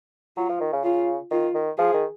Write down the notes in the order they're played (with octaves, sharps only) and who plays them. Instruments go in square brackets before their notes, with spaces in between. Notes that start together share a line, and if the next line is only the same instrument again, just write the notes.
[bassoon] F#3 [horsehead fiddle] F4
[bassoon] F3
D#3
C#3
[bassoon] C#3 [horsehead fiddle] F4
[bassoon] D#3 [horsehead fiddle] F4
[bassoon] D#3
[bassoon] F3 [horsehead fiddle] G#4
[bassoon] D#3